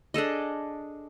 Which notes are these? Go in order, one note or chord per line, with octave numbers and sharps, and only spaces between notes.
D4 G#4 A4 D#5